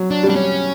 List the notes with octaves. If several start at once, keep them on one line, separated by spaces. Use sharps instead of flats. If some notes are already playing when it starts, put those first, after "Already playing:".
Already playing: F#3
D4
G3
D4
C#4